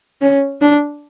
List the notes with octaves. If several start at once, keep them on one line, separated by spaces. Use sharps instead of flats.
C#4
D4